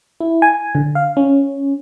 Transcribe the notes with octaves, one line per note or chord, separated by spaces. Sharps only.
E4
G#5
D3
F5
C#4